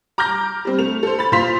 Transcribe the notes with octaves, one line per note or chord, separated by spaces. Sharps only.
A#5 D6 F6 G6 A#6
G3 C4
A3 F7
A4 C5
B5 A6
A#2 F4 C5 C6 B6 F7